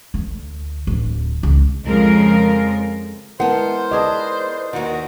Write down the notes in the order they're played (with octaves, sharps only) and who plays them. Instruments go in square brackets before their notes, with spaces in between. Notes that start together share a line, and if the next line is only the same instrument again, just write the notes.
[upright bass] D2
D1
C#2
[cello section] F2 C#3 F3 G#3 F4 A#4
[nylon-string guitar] G#3 B3 [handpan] E4 A#4 [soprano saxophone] C5 [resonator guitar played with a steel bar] F#5 A5
[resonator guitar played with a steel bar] G4 G#4 A5 [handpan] B4 D5 D#5
[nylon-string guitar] D#2 D#3 [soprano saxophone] F#4